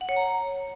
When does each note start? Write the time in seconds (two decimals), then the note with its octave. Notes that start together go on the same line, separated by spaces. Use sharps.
0.01 F#5
0.09 C#5
0.16 A#5